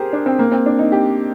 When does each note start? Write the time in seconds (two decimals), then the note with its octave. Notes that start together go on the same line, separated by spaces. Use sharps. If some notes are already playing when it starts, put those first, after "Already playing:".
Already playing: G4 G#4 A#4 C5
0.13 D4
0.26 C4
0.39 A#3
0.52 C4
0.66 D4
0.79 D#4
0.92 G4